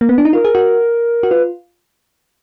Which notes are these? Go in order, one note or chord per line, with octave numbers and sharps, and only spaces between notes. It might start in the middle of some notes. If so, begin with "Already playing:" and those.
A#3
B3
D4
D#4
F4 A#4
G#4
F#4
F#4
F4 B4